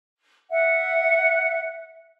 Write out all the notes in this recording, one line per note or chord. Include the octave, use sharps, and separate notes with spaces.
E5 F#5